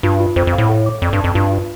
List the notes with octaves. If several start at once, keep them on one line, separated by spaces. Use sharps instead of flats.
G2 F4
F4
F2 C5
F2
F5
A2
A4
D6
F2 D5
G2
F2 A5
G2 F4
F4